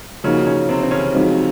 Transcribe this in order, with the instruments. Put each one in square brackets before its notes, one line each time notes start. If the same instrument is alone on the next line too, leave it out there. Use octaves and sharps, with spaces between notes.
[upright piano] C#3 C#4 [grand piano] F3 A#3 D#4 F#4
[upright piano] C#3 C#4
C3 C4
C4
C#3 C#4
[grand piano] F3 G#3 C4 D#4 F#4